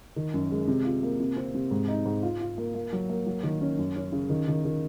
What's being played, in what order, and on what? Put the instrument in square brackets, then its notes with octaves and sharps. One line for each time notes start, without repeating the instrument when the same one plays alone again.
[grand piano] D#3
F#2
G#3
C3
F4
A#3
C3
C4
C3
G#2
D#4
G#2
F4
F4
A#3
A#3
F#3
A#3
F#3
D#3
C#4
F#2
C#4
C#3
D#3
D#3
D#3